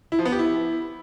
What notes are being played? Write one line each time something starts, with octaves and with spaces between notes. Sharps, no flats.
E4
F3
B3
G4
E4